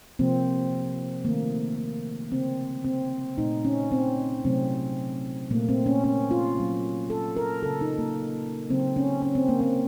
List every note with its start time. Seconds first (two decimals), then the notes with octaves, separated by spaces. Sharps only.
0.19 C3 F3 A#3 C4
1.25 D#3 A3 A#3
2.31 C#3 A3 C4
2.84 C4
3.38 A#2 A3 D#4
3.65 C#4
3.92 C4
4.45 C3 F#3 A3 C4
5.51 A#2 A3 A#3
5.69 C4
5.86 C#4
6.04 C#4
6.31 F4
6.56 A#2 F#3 A#3
7.10 A4
7.37 A#4
7.63 C#3 A3 A4
7.81 D#4
7.98 A#3
8.70 C#3 F#3 A#3 C4
8.96 C#4
9.22 C#4
9.35 C4
9.49 A#3
9.61 C4